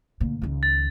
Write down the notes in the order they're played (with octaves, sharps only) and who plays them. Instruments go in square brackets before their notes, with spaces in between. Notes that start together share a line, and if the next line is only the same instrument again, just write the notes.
[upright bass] D2 A#2
C#2 D#3
[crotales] A6